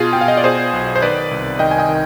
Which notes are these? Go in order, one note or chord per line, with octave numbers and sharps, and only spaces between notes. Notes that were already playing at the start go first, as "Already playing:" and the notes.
Already playing: B2 F4 G#4
B2 G5
F5
D#5
D5
B2 G#4 C5
B1
C5
D#3 B4 D5
C2
D#3 D#5 G5
G#5
D#5 G5
D#3